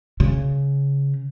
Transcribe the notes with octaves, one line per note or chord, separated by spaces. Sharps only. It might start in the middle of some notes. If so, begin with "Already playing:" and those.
C#3